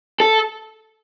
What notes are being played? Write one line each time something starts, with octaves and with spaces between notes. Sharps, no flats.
A4